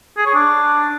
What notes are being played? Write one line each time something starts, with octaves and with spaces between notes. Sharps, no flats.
G#4
C#5
D4